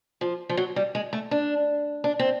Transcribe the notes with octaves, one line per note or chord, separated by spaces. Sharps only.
F3
F3
F#3
G3
G#3
A3
D4
D4
C4